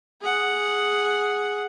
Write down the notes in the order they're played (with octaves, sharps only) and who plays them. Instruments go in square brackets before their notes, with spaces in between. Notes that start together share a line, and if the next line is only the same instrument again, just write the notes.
[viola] G#4 F#5